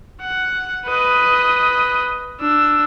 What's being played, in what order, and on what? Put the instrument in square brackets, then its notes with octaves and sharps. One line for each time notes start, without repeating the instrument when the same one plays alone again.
[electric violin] F#5
B4 D#5
D4 E6